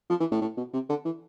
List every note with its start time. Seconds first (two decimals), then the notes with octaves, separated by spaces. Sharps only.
0.10 F3
0.20 E3
0.31 A2
0.41 A2
0.57 B2
0.73 C3
0.89 D3
1.05 E3